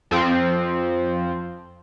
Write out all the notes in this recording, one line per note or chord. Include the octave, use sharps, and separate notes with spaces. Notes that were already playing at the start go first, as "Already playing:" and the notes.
F2 F3 C4